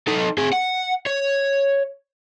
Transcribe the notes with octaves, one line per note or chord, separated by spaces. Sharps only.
D#4 A4
C4 G#4
F#5
C#5